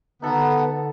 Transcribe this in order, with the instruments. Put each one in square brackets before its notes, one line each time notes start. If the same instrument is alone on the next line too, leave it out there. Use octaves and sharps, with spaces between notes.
[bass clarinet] D3 [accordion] B3 [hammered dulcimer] D#4 A4